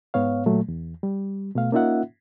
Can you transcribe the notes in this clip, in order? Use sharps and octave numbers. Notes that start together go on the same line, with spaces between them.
G#2 B3 C#5 F5
A#2 F#3 A3
E2
G3
B2 A3 F5
A#3 C#4 D#4 F4 E5 F#5